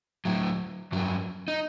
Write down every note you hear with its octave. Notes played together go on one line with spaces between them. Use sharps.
A2 F#3
G2 F#3
D#4